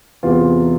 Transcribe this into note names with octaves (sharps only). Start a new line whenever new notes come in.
E2 C3 E3 F4